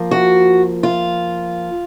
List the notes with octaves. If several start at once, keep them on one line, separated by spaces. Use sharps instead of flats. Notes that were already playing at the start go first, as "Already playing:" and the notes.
Already playing: F3 A#3
F#4
F4